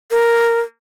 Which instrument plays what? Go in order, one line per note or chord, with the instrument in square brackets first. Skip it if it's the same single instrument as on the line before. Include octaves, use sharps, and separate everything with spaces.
[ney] A#4